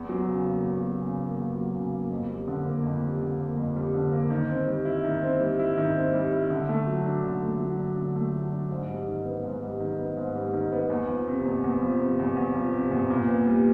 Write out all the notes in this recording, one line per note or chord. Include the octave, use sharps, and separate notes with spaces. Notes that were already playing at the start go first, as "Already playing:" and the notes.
Already playing: E2
F#3
C#3
A#3
E2
F#3
C#3
A#3
E2
F#3
C#3
A#3
F2
G3
D3
A#3
F2
G3
D3
A#3
F2
G3
D3
A#3
D#3
C4
G3
E4
D#3
C4
G3
E4
D#3
C4
G3
E4
D3
A3
F#3
D4
D3
A3
F#3
D4
D3
A3
F#3
D4
G#2
G3
D#3
B3
G#2
G3
D#3
B3
G#2
G3
D#3
B3
E2
F3
C3
E2
E2
F3
C3
E2
E2
F3
C3
E2
A#2
B3
G3